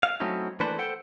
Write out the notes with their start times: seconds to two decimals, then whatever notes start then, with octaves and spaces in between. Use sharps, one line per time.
0.03 F5
0.20 F#3 A3 C4 C#4 D#4 E4
0.60 E3 A3 A#3 D4 B4 C5
0.78 A4 C5 F#5 G5